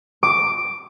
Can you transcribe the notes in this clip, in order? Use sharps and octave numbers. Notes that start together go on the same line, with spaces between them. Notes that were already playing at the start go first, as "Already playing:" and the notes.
D6